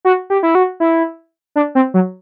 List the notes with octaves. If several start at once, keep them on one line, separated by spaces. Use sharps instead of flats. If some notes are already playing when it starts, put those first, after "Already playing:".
F#4
G4
E4
F#4
E4
D4
C4
F#3